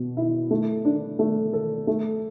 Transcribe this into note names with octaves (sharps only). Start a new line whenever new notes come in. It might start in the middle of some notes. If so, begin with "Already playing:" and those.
Already playing: B2
E4
A3
D4
A3
A4
A3